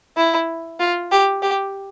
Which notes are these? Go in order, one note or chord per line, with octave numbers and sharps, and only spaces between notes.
E4
F4
G4
G4